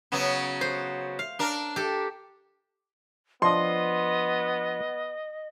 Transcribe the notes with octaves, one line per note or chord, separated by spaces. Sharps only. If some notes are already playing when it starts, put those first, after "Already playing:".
C#3 F#3 B3
C5
F5
D4 A#4
G4 A4
F3 B3 D4 D#5 C6